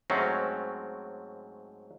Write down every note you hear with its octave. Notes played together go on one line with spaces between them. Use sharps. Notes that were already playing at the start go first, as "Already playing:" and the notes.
G#2 F#3 A3 C4 C#4